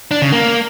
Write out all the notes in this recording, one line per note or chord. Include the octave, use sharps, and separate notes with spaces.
D4
C#3
A#3